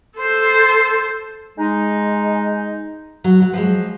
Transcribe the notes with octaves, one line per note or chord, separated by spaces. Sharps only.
A4 C5
G#3 D#4
F#3
F#3
F3 F#3 G#3